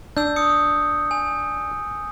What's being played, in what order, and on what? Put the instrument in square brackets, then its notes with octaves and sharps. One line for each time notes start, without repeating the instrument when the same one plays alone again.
[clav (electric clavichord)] D4 [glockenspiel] E6 G6
[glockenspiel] D#6 C#7
G#5